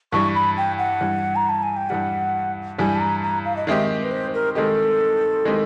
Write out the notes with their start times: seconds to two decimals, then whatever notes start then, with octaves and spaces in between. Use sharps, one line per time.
0.12 G2 E3 G3 C#6
0.35 B5
0.57 G5
0.79 F#5
1.01 G2 E3 G3
1.36 A#5
1.49 A5
1.63 G#5
1.76 G5
1.89 G2 E3 G3 F#5
2.78 G2 E3 G3 G#5
2.96 A5
3.01 A#5
3.23 A#5
3.45 F5
3.56 D#5
3.67 D#3 G#3 C4 D#4 G4 E5
4.02 B4
4.11 C5
4.34 A#4
4.55 D#3 G#3 C4 D#4 G4 A4
5.45 D#3 G#3 C4 D#4 G4